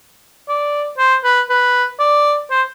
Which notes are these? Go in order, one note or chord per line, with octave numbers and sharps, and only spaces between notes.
D5
C5
B4
B4
D5
C5